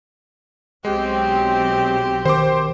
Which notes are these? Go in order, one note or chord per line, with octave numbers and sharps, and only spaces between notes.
B1 F#3 G#3 C4 G4
D#3 C5 C6 D6